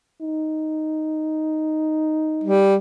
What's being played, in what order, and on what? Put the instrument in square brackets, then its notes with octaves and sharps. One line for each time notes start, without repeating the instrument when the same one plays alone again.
[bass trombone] D#4
[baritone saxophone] G3